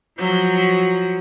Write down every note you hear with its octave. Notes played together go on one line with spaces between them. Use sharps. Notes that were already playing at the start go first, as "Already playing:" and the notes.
F3 F#3